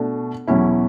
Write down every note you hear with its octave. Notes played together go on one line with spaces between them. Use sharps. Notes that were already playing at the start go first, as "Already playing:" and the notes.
Already playing: B2 A3 D4
E2 B2 F#3 C#4 E4